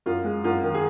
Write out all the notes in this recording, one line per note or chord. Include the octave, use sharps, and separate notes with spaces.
F#2 F4
G#3
F#2 F4
D#3
G#4